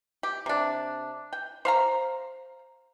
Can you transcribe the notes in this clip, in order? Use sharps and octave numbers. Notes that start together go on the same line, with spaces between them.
G4
C3 D4
G5
C5 F5 A#5